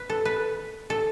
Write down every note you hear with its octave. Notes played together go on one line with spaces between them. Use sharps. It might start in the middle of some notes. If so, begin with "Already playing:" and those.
Already playing: B4
A4
B4
A4